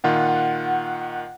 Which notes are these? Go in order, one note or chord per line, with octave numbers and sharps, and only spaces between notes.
A#2 D#3 F4 F#5
F#5